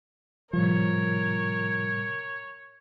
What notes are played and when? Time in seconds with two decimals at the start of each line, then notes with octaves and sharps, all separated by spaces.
0.53 A2 C3 F3 G3 A#4 C#5